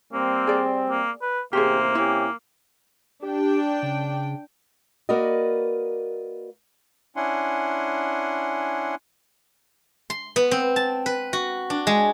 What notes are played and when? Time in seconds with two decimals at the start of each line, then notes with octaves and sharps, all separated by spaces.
0.13 G3 A#3 C4
0.47 G#4 D5
0.90 A#3
1.21 B4
1.53 A1 C3 A#3 G4 G#4 C5
1.95 C3 C#4 E4 G4
3.22 D4 G4 G5
3.82 C#3
5.09 A#3 F#4 A#4 B4 D5 D#5
7.16 C#4 D4 E4 F#5 G#5 C6
10.10 C6
10.36 B3
10.51 C4
10.76 A5
11.06 B4
11.33 F#4
11.70 D4
11.87 G#3